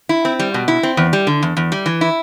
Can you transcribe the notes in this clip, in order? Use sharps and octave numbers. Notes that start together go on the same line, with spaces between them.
E4
C4
G3
B2
E4
C4
E2
G3
D3
E2
E2
G3
E3
E4